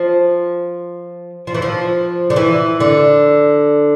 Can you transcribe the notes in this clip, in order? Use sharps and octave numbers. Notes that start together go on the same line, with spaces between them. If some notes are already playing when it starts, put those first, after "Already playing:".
Already playing: F3
F3
E3
F3
D3
E3
D3